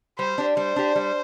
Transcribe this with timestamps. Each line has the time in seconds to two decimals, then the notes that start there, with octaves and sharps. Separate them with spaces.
0.18 G3 C5
0.38 D4 G4
0.57 G3 C5
0.76 D4 G4
0.96 G3